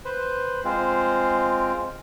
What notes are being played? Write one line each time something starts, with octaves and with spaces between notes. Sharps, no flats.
B4 C5
G#3 C4 F4